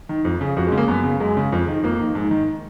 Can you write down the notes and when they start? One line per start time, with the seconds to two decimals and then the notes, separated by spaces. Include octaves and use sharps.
0.09 D#3
0.25 F2
0.41 C#3
0.56 F2 F#4
0.67 G#3
0.72 C#3
0.78 A#3
0.88 F#2 B3
1.04 C#3
1.20 F#2 G#3
1.37 C#3
1.52 F2
1.68 D#3
1.83 F2 A#3
2.00 D#3
2.15 G#2
2.31 D#3